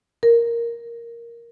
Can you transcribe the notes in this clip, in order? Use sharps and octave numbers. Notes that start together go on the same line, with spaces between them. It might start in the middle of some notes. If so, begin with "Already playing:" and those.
A#4